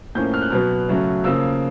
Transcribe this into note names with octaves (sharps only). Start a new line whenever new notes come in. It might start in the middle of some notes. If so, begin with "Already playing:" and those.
A2 F3 A#3 C#4 G6
F6
F#6
B2 F#3 B3 F6
C#3 F#3 A3 C#4
C#3 F3 A#3 E6